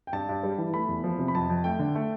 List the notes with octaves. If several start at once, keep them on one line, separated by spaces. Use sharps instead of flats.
G5
G2 A5
G2
G3
E3
A3 B5
E2
F3
C3
B5
F2 A5
F2
A3 G5
D3
A3